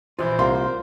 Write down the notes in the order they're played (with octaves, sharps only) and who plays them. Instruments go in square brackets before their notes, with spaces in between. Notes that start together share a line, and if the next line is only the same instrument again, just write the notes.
[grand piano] A#1 E3 B5 [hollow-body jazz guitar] F4 [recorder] C5
[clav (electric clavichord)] C2 A#3 [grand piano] F4 A#4 [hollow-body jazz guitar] C6